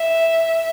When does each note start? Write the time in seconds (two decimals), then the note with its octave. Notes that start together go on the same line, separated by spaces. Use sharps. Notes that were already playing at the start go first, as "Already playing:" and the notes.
Already playing: E5